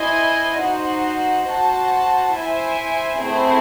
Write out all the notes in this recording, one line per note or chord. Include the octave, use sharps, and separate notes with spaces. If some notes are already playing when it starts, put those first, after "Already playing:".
Already playing: E4 C5 D#5 G#5
D#4 F#4 C5 F#5
F#4 C5 F#5 A5
E4 C5 E5 G#5
A3 C4 E4 G#4 C5